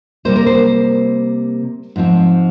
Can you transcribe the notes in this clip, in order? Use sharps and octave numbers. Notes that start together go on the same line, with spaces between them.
C3 G3 A#3 C5
A#4
C5
G#2 F3 C4